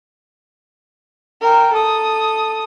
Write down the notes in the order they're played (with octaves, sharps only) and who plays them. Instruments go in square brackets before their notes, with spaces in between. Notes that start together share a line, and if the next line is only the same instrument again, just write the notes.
[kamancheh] A#4 G5
A4 D#6